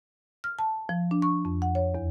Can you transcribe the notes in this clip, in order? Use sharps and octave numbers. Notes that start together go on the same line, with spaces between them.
F6
A5
F3
D4
C#6
F2
F#5
C#5
E2